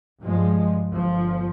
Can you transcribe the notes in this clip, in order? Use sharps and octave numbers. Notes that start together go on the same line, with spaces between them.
G2 F3 G#3
G1 F3